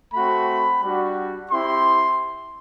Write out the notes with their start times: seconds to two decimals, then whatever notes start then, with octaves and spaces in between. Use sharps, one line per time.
0.13 A3 C4 F#4 B5
0.82 G3 D4 F#4
1.51 C4 E4 G4 C6